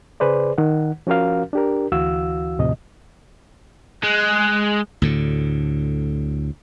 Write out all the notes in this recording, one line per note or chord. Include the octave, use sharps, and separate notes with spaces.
C#3 G#4 B4 C5 D5
D#3 F#5
F3 C#4 F#4 A#4 F5
D4 G4 A#4
D2 E3 F#4 F5 E6
D#2 A2 C3 F3 D#5
G#3 F#6
D2 A2 D3